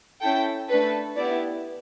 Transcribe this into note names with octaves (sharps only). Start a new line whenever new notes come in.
C#4 E4 A4 G5
A3 D4 A4 B4
B3 E4 G4 D5